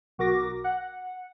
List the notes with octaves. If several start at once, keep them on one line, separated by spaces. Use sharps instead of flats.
B1 F#4 A#4 D6 A#6
F#5